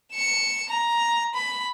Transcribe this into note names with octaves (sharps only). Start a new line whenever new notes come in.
C#7 E7
A#5
B5